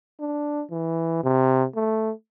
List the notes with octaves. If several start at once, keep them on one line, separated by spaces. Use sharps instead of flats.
D4
E3
C3
A3